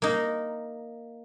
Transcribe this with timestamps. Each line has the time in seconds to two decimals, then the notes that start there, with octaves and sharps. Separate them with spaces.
0.02 A#3 D#4 A#5